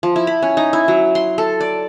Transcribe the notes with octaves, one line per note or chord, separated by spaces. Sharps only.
F3
E4
B5
C#4
D#4
E4
F#3
C6
A4
D5